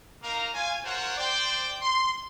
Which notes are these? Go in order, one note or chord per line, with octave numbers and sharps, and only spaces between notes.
A#3 D#4 A#4 F5 A#5
F4 C#5 F5 G#5
F4 F#4 A#4 C5 C#5 F#5
C5 D5 G5
C6